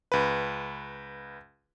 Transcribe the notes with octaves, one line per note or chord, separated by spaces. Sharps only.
C#2 B4